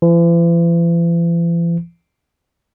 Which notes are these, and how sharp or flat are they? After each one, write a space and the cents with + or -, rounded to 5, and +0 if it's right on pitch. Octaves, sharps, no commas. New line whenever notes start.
E3 +45